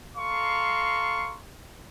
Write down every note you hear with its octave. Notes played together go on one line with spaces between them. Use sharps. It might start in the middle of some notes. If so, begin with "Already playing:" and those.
A4 F5 A#5 C6 C#6